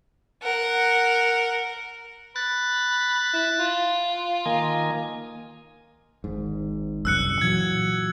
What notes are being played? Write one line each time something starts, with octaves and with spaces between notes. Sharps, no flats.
A#4 F#5
B5 F#6 A6
E4
F4
D#3 A#3 G#5
G#1 G#2
F#1 C2 F#2 E6 F#6 C#7
A#2 E3 F#3 G#6